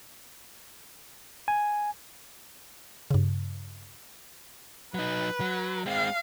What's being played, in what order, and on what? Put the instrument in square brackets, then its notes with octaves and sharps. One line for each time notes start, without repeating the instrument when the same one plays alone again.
[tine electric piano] G#5
[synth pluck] G2 C#3
[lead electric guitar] F#3 D#4 [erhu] B4
[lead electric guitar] F#3
[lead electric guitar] G#3 C4 [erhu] F5